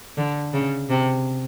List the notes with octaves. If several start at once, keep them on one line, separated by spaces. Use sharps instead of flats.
D3
C#3
C3